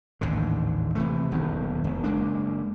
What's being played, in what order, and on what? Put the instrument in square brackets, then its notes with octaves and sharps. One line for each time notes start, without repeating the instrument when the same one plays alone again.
[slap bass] A1 D#2 G#2 D3
C3 E3 A3
D#1 B1 E2 D#3
E1
F#1 G#3 A#3 D4